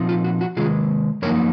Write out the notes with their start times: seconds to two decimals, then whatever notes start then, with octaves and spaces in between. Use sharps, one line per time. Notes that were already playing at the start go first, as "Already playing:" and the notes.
Already playing: A#2 F3 C4 D#4
0.09 F4
0.24 F#4
0.41 F#4
0.57 C3 D#3 G#3 F4 G#4
1.22 F#2 F3 A#3 D#4 A#4 C#5